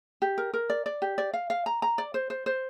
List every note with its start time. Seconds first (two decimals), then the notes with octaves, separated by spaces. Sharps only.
0.22 G4
0.38 A#4
0.54 A#4
0.70 D5
0.86 D5
1.02 G4
1.18 D5
1.33 F5
1.50 F5
1.66 A#5
1.82 A#5
1.98 D5
2.14 C5
2.30 C5
2.46 C5